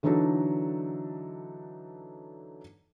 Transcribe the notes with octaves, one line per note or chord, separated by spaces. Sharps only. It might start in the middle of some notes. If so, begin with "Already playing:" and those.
D3 E3 F#3 D4 D#4 A4